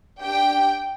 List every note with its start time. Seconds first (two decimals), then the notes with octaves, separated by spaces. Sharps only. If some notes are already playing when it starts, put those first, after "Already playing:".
0.20 D4 G4 G5